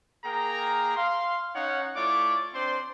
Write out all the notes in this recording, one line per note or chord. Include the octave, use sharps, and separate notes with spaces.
A#3 G#4 A#4 G5 A#5
F5 C6
C#4 D#4 C#5 F5 F#5
A3 E4 F4 C#5 D5 D6
C4 D4 C5 D5 C6